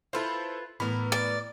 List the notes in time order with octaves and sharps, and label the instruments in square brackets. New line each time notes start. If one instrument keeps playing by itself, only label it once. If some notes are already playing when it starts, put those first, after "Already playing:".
[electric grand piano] E4 A4 C5 [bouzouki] F4 B4
[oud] A2 E3 [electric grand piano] B3 B5 [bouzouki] A#4
[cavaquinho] D5